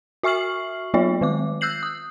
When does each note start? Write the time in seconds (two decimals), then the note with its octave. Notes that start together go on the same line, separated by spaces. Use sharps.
0.23 F#4 E5 C#6 F6 C7 F#7
0.94 F#3 B3 F4 C#5 E5
1.21 D#3 G#3 D6
1.61 E6 F#6 G6 C7 F#7
1.83 D#6